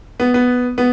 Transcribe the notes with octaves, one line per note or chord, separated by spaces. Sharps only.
B3
B3
B3